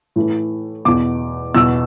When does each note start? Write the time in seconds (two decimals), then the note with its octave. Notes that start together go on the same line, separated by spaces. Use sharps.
0.16 A2 E3
0.85 E2 B2 D6
1.54 E2 B2 E6